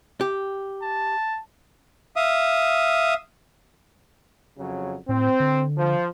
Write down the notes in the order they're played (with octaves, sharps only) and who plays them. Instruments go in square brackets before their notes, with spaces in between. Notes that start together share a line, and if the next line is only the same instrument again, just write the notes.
[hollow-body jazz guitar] G4
[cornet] A5
[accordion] E5 F5 D#6
[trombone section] F2 C#3 F#3
[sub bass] A2 [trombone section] C4
[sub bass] D3
[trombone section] F3